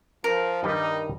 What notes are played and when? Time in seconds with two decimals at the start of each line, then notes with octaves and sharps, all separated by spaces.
0.24 F3 A#4
0.63 G2 D#3 G3 D#4